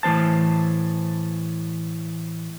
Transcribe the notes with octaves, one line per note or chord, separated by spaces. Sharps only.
A2 E3 G#3 C5 A5